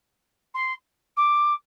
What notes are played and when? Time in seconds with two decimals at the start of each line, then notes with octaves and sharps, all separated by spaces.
0.54 C6
1.16 D6